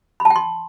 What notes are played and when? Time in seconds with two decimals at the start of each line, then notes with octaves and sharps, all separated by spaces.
0.20 B5
0.25 A5
0.30 G5
0.36 C6